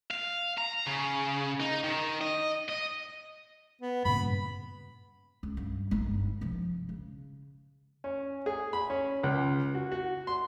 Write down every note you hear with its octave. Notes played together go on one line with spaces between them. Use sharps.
F5
A#5
C#3
D#4
D#3
D#5
D#5
B3
G2 A#2 C#3 B5
C#2
G2
G1 D#4
C3 F3
C#3
C#4
G#4
B5
C#4
C#2
F#4
F#4
C6